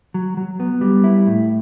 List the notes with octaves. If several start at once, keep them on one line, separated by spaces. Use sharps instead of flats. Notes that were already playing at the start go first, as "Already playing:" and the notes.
F#3
F#3
B3
G3
E4
A2